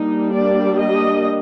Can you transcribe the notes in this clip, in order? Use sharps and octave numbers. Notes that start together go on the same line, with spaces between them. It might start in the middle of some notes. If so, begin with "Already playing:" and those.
Already playing: G3 A#3 D4 D#4
D5
D#5